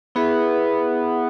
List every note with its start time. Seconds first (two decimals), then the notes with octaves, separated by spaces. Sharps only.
0.15 B3 E4 G#4 B4 E5